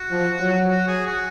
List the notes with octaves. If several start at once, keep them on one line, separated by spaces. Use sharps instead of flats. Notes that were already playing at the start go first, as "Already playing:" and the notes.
Already playing: F#4
F3
F#3
F#4
G#4
F#4